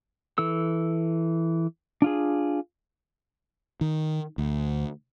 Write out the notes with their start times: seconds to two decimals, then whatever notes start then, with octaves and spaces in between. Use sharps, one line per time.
0.38 E3 A4 E6
2.02 D4 F4 G#4
3.81 D#3
4.38 D2